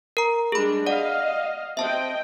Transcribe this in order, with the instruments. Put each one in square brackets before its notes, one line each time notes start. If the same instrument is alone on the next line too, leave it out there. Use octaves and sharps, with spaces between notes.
[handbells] A#4 A#5
[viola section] G3 G#3 D4 [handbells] G#4 B5
[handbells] D5 F#5 [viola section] D#5 F5
[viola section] C4 D#5 G5 [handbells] E5 A5